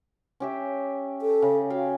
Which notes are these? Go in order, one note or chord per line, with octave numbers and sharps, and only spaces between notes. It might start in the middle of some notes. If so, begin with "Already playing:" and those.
C#4 G4 E5
A4
C#3
F#4 F5 G5 G#5